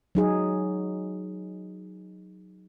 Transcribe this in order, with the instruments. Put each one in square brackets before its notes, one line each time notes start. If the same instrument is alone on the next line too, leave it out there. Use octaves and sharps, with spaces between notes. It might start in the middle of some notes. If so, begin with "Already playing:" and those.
[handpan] F#3 D#4 G#4